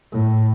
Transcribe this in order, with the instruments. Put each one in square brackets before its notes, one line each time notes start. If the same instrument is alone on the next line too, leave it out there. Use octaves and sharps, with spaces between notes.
[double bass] A2